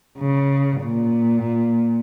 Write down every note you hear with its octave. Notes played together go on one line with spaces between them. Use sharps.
C#3
A#2